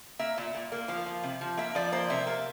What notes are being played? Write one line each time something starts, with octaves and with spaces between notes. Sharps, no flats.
A#3 E5
A#2
A#2
A#3
F3 F5
F3
C3
F3
A#3 E5
F3 D5
A#3 C5
C3 E5
A#3